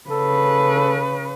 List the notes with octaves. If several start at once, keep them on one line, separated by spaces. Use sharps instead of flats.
C#3 A4 B4